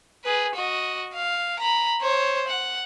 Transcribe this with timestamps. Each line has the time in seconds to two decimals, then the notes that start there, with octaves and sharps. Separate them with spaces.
0.25 G#4 B4
0.55 F#4 D#5
1.14 F5
1.60 A#5 B5
2.02 C5 C#5
2.48 F#5